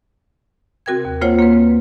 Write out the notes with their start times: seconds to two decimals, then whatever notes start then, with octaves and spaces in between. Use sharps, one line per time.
0.86 C3 C4 F#4 A#4 G5 G#6
1.05 D#2
1.21 A#3 F4 C5 C#5 F#5
1.38 A#3 C4 B4
1.53 C4